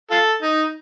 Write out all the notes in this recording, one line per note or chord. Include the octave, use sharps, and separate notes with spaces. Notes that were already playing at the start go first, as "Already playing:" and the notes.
F4 A4
D#4